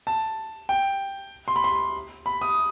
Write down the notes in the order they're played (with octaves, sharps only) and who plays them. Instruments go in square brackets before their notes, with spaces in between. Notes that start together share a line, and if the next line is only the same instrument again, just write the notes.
[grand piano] A5
G5
C6
B5
C6
B5
D#6